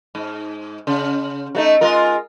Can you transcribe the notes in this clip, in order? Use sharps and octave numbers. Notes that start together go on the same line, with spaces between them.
G#2
C#3
F#3 A3 D#4
G#3 F4 A#4